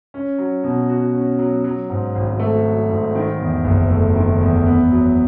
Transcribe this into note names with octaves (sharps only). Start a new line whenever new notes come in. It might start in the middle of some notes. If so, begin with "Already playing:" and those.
C#4
F#3
B2
F#4
C#4
F#3
F#3
G#2
G#1
A3
F#3
G#2
D#3
E2
F#1
A3
D#3
E2
B3
F#3